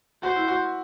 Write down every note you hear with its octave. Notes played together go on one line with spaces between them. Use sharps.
F#4 C5
E4
F#4